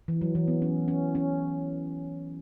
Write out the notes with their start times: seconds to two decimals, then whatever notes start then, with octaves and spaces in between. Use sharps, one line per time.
0.08 E3
0.21 F#3
0.35 E3
0.48 B3
0.62 C#4
0.88 C#4
1.15 C#4